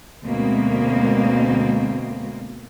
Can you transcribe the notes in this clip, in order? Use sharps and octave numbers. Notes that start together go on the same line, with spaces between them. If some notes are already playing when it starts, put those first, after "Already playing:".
D2 B2 G#3 A#3 C4